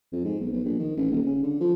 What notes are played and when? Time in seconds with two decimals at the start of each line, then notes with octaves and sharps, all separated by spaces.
0.13 F2
0.24 G#2
0.40 B1
0.52 B1
0.65 A#1
0.80 D#3
0.97 A1
1.11 D#1
1.26 C#3
1.43 D3
1.61 F3